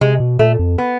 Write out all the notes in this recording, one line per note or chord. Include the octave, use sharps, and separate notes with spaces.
C3 G#3
B2
A#2 A3
F2
B3